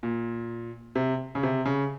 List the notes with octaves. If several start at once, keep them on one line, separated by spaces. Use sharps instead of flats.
A#2
C3
C#3
C3
C#3